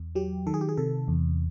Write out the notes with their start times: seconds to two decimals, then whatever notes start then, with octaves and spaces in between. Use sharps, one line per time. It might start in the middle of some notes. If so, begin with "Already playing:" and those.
Already playing: E2
0.15 F#3 G4
0.47 D#3 A4
0.54 G#4
0.61 G4
0.69 G#4
0.77 C3 A4
1.08 E2